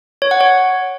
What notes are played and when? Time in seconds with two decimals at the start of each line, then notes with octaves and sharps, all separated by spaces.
0.22 C#5
0.31 F#5
0.41 C#5